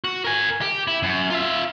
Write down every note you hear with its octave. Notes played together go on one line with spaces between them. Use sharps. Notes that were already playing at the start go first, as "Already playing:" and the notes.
F#4
A#4 G#5
G4
E4
F#2
F4 E5